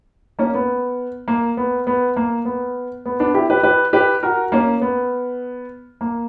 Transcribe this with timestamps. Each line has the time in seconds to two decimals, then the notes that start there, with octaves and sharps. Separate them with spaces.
0.39 A#3 C#4
0.54 B3
1.28 A#3
1.57 B3
1.87 B3
2.16 A#3
2.45 B3
3.06 B3
3.20 B3 D4
3.34 E4 G4
3.50 G4 B4
3.63 G4 B4
3.93 G4 B4
4.23 F#4 A#4
4.52 A#3 C#4
4.82 B3
6.01 A#3